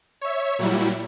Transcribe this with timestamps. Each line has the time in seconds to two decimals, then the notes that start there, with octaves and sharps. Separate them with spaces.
0.21 C#5 E5
0.59 A#2 F#3 G3 E4